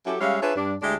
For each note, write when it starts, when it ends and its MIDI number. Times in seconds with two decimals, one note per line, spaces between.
0.05 0.15 54
0.05 0.15 61
0.05 0.15 64
0.05 0.15 67
0.05 0.15 69
0.20 0.41 55
0.20 0.41 56
0.20 0.41 61
0.20 0.41 76
0.20 0.41 77
0.42 0.54 62
0.42 0.54 65
0.42 0.54 68
0.42 0.54 71
0.42 0.54 73
0.42 0.54 76
0.56 0.75 43
0.56 0.75 62
0.82 0.95 38
0.82 0.95 56
0.82 0.95 62
0.82 0.95 64
0.82 0.95 67